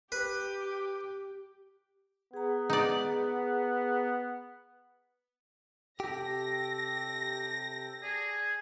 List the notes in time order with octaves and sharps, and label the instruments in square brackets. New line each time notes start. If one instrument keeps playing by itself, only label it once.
[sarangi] G4 [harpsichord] B4
[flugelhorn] B3 [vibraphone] G#4 A#5
[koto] D#4 D5
[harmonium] C3 A4 G5 [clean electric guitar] G4 [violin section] A#6
[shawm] G#4 [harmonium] D5 A5